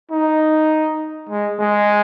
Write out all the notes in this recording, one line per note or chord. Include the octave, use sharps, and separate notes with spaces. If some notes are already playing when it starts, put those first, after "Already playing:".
D#4
G#3
G#3